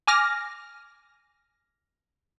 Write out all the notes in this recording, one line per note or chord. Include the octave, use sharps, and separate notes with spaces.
G#5 D6 F6 A#6